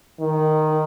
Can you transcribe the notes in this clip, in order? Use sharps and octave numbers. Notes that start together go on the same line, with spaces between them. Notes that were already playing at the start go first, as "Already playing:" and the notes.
D#3